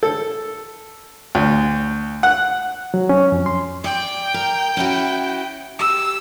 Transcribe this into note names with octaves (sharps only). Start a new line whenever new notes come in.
A4
D2
F#5
F#3
C#4
F2
C6
D5 G5
A#4
C#4 E4 F#4
G4 E6